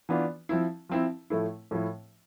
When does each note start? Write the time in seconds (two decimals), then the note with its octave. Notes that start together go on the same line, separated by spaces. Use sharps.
0.09 E3 B3 D4 F4
0.49 F3 C4 E4
0.89 F3 C4 E4
1.30 A2 F3 A3 E4
1.71 A2 F3 A3 E4